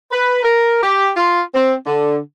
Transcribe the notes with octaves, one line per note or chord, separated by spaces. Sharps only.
B4
A#4
G4
F4
C4
D3